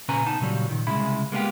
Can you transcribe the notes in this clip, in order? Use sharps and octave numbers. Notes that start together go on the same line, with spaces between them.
A#2 C#3 C#4 B4 G#5 A#5
B3 D#4 A5
A#2 C#3 F#3 G3
A#2 D#3
C2 C#3 G#3 E4 B5
G#3 A#3 B3 C#4 F4 G4